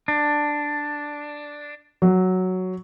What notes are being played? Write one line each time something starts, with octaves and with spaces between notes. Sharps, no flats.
D4
F#3